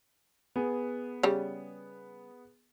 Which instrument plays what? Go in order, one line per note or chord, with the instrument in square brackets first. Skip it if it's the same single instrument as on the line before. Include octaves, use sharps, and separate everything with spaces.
[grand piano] B3 G#4
[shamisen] C#3 G3